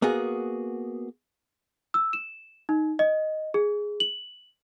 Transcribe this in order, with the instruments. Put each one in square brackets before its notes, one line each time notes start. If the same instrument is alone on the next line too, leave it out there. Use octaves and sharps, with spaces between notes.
[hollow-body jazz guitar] A#3 B3 F#4 G#4
[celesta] E6
E7
D#4
D#5
G#4
F#7